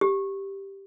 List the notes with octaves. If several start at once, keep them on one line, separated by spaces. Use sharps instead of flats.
G4